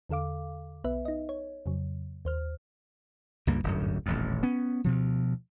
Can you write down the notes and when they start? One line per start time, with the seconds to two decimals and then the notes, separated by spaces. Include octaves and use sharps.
0.09 E2 D3 A4 F5 D6
0.84 B1 B3 B4 E5
1.05 D#4 D#5
1.29 C#5
1.66 F2 C#3 F#3
2.25 D#2 C5 F6
3.47 C#2 G2 A#3
3.64 D1 G1 F#2
4.06 D#1 A1 F2
4.43 B3 C#4
4.84 D2 B2 F3